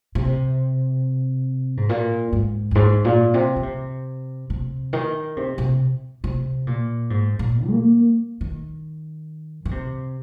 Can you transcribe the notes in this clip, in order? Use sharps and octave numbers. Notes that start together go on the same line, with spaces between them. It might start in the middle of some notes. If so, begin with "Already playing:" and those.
C3
G#2
A#2
G#2
F2
G#2
A#2
C3
D#3
C3
C3
D#3
C3
C3
C3
A#2
G#2
A#2
A#3
D#3
D#3
C3